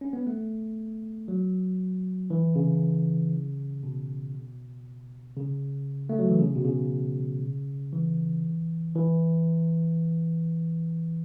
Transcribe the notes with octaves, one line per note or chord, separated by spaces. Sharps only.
C#4
B3
A3
F#3
E3
C#3
B2
C#3
A3
F#3
E3
C#3
B2
C#3
E3
E3